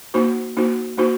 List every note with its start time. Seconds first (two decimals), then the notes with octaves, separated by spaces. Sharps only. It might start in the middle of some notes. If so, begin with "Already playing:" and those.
0.14 A#3 D#4 F#4 C5
0.57 A#3 D#4 F#4 C5
0.97 A#3 D#4 F#4 C5